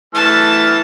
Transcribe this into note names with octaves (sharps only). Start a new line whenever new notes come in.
E3 A3 A5 F6